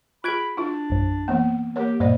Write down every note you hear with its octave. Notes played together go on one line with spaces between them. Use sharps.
F4 G#4 B5 F#6 G#6 D7
D4 E4 F4
A#1 F#2
E3 A#3 B3
A#3 G4 A#4 C#5
G2 A#2 A#3 C5 D5 D#5